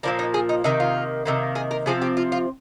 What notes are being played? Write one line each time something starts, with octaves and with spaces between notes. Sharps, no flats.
A#2 F3 A#3 D4
D#4
G#4
D#4
C3 D#3 A#3 D#4
F4
C3 D#3 A#3
G#4
A#4
C3 F3 C4 G#4
G4
F4
F4